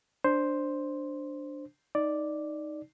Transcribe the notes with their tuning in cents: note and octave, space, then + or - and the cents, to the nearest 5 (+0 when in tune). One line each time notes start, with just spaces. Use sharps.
D4 +0 C5 +0
D#4 +0 D5 +0